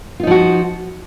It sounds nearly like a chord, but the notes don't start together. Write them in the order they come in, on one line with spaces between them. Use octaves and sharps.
F4 D#4 F3 F#4